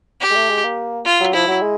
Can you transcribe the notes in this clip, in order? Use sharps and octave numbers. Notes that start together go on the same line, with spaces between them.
G4
G#3
A3
G#3
A#3
F4
F#3
F3 E4
F#3
G#3